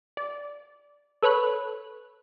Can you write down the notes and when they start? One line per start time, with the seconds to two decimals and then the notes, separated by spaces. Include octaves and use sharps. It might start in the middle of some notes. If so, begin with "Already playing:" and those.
0.17 D5
1.22 A4 B4 C#5 B5 F#6